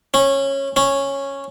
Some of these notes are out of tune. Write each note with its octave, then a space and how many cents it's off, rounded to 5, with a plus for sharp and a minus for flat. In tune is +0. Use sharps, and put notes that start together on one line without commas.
C#4 -15
C#4 -5